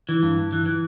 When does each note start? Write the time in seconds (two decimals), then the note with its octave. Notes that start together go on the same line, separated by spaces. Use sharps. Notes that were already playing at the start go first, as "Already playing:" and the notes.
0.09 E3
0.23 G2
0.37 G2
0.53 E3
0.66 E3